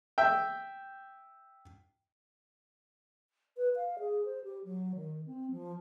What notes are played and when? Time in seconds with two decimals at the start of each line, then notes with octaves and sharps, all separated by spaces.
0.18 E5 G5
3.57 B4
3.76 F5
3.99 G#4
4.25 C5
4.44 G4
4.65 F#3
4.96 D#3
5.26 C4
5.51 F3